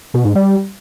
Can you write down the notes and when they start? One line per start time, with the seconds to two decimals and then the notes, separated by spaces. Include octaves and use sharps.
0.14 B2
0.25 G#2
0.35 G3